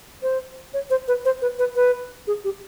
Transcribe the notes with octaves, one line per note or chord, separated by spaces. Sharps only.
C5
C#5
C5
B4
C5
B4
B4
B4
G#4
G4